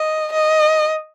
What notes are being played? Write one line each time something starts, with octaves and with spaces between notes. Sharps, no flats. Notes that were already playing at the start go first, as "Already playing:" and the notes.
Already playing: D#5
D#5